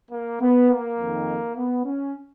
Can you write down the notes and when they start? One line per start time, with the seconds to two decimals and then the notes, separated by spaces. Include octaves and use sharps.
0.11 A#3
0.40 B3
0.69 A#3
0.98 F2 D#3
1.56 B3
1.85 C#4